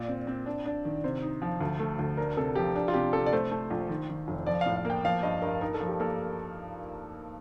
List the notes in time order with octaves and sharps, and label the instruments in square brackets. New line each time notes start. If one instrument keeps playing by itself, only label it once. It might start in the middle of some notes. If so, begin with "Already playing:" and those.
Already playing: [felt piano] A#2 [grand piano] D5
[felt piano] C4
C4
D4
D4
D#3
[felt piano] C3 [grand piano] C5
[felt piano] D#4
F3
D2
A3
D2
[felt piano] D4 [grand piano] A#4
[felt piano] C3 [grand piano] A4
[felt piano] F3 [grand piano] G4
[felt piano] D4
[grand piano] F4
[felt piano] C3 [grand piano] G4
[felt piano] C3 [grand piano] A4
[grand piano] D5
[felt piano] A3 [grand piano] C5
[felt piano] A3
A#1
D#3
D#3
F1
[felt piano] F3 [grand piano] D5
[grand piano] F5
[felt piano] A2
[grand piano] F5
[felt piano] A#3
[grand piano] G5
[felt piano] F3 [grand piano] F5
[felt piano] G2 [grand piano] D#5
[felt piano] G2 [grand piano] A#4
[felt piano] D#4 [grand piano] A#4
[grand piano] A4
[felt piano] F3
[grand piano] G4
[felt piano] A#3 [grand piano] A4